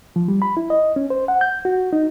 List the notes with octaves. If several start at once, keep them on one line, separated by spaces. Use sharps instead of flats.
F3
G3
B5
E4
D#5
C#4
C5
F#5
G6
F#4
D#4